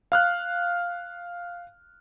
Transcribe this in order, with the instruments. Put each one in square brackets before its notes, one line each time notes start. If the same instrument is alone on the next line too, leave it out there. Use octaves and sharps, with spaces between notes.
[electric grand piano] F5 F6 F#6